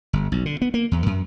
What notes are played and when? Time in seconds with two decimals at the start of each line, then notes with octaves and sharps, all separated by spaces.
0.13 G1
0.32 B1
0.46 D3
0.62 B3
0.74 A#3
0.92 E2
1.06 F#2